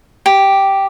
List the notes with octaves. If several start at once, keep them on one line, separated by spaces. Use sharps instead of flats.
G4